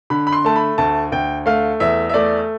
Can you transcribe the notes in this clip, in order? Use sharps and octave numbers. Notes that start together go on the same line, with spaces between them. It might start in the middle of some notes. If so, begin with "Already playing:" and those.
D3 B5
B5
C6
A3 A5
B5
D2 A5
D2 G5
A3 F5
E2 E5
E5
A3 D5